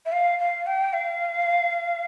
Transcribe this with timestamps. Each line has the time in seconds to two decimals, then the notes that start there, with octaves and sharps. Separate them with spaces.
0.05 E5
0.12 F5
0.39 F5
0.66 G5
0.93 F5